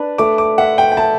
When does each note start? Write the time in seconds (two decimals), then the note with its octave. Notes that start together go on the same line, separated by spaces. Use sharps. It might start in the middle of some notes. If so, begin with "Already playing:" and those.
Already playing: D4 B4
0.18 A3 D6
0.38 D6
0.58 E5 F#5
0.78 G5
0.92 G5
0.97 E5 A5